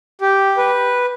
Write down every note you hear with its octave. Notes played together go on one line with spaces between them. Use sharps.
G4
B4